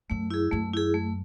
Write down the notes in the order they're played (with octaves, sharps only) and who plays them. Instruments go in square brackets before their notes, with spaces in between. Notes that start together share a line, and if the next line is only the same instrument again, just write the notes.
[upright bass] F#2 [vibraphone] A3
[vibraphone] E4 G#4
[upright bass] F#2 [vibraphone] A3
[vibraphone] E4 G#4
A3